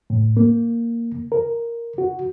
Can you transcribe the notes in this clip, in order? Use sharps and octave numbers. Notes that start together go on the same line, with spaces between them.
A2
A#3
A#4
F#4